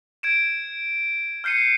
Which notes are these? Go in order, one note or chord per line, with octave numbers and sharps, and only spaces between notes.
G#6 D7 E7
F6 G6 C7 C#7 D#7